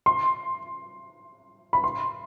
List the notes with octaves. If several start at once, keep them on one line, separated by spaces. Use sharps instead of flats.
C6
B5
C6